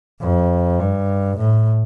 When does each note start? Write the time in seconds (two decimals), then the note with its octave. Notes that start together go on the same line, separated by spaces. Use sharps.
0.21 F2
0.79 G2
1.37 A2